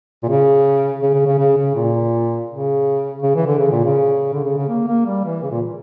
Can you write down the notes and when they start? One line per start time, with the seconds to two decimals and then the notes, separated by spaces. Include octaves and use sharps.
0.23 A#2
0.29 C#3
1.02 C#3
1.14 C#3
1.26 C#3
1.38 C#3
1.57 C#3
1.76 A#2
2.50 C#3
3.22 C#3
3.35 E3
3.47 D3
3.59 C#3
3.71 A#2
3.84 C#3
4.33 D3
4.45 C#3
4.57 C#3
4.69 A#3
4.87 A#3
5.06 G3
5.25 E3
5.43 C#3
5.51 A#2